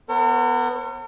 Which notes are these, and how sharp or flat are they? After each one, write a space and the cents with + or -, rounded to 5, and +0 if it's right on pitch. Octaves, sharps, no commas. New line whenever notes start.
B3 +5 A#4 -45 C#5 -45